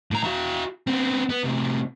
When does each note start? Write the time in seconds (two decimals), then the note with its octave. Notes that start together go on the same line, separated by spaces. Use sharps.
0.11 A2 A#5
0.24 E4 F#4
0.87 B3 C4
1.29 B3
1.44 A2 C3